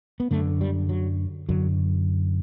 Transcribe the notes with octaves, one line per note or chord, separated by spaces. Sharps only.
B3
F#2 D3 A3
G3
F#3
F#2 D3 F#3